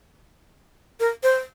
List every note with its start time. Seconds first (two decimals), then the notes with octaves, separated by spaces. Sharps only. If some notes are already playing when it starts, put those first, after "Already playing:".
1.00 A#4
1.23 C5